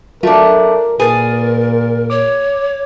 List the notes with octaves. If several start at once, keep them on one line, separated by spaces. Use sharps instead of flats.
F#3 A3 D4 F4 A#4
A#2 G#4 A#4 B4 A6
C#5 D6